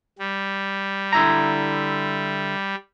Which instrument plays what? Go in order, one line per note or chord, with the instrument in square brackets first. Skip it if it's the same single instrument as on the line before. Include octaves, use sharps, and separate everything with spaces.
[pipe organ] G3
[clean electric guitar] D3 E4 A#5